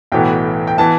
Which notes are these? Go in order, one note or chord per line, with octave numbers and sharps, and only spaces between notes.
B1 A2 E3 B3 G5
G5
E3 B3 A5